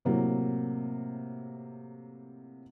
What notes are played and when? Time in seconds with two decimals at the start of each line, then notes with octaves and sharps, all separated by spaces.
0.05 A2 C3 F#3 A#3